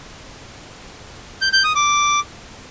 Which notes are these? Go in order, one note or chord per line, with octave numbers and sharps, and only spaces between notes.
G6
G6
D#6
D6